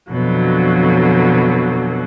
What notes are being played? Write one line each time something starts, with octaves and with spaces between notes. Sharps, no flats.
F2 B2 D3 F#3